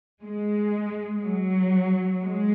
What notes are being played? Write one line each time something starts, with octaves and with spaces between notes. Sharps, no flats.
G#3
F#3
G#3